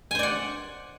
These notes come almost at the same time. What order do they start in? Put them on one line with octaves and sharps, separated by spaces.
G#5 C5 D5 F#5